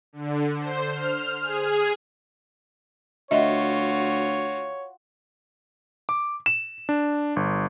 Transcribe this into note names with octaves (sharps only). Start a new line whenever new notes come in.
D3
C5
F6
G#4
D2 F4 F#4 C#5 D#5 E5
D6
E7
D4
G1